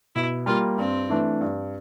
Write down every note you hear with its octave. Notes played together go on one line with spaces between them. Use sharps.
B2 E4
G3 A#3 F4
G2 C4
E3 A3 D4
G2